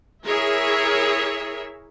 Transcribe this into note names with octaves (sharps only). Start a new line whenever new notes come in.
E4 G#4 A#4 C#5 E5